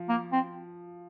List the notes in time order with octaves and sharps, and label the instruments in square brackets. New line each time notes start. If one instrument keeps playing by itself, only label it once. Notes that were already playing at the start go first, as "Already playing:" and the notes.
Already playing: [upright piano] F3
[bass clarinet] A#3
C4